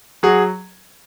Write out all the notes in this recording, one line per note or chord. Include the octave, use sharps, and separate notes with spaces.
F#3 F#4 G#4